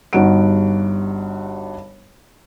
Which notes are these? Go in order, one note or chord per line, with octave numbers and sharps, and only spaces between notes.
G1 G2 D#4 F#4 F#5 D7